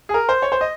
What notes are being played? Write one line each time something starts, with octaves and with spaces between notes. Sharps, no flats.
G#4
A#4
C5
C#5
C5
D#5